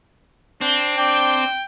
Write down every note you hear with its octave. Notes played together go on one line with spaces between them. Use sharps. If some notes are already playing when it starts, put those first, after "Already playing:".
C4 D4
D4 G5